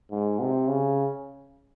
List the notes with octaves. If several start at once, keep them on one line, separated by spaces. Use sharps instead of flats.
G#2
C3
C#3